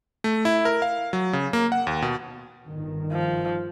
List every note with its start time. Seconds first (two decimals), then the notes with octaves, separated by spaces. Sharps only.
0.24 A3
0.45 E4
0.65 A#4
0.82 F5
1.13 F#3
1.33 C#3
1.53 A#3
1.72 F#5
1.87 D#2
2.02 B2
2.67 G1 D#3
3.12 F3